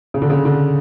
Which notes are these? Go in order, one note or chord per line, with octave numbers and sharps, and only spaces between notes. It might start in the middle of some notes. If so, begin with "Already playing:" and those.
C#3
D3
C#3
D3